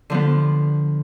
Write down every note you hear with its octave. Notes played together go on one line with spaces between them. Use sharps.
D3 F3 B3